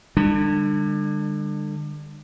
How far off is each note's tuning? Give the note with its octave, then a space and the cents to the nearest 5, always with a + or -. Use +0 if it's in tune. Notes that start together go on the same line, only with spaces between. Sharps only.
D3 +30 G3 +45 D4 +30